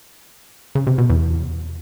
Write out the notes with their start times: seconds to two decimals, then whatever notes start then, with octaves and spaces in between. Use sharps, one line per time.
0.75 C#3
0.87 C3
0.98 B2
1.10 E2